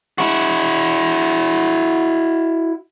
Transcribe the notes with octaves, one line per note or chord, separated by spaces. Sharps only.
E4 F#4